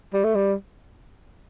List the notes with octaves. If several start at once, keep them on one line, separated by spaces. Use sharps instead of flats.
G3
A3
G3